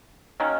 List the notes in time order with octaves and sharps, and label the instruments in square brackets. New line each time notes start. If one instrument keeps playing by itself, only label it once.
[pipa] D#3 F#3 A#3 C#4